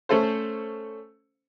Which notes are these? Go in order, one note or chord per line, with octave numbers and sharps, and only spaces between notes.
A3 C#4 A4 C5